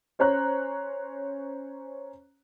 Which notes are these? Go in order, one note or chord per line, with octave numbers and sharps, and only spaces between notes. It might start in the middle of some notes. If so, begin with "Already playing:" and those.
C#4 C5 C#5 A#5 F#6